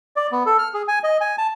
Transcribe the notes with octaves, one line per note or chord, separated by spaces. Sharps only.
D5
B3
A4
F6
G#4
G#5
D#5
G#5
A5